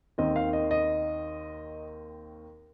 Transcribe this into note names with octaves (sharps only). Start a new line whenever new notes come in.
D#2 D#3 C4 D#5
F5
D#5
D#5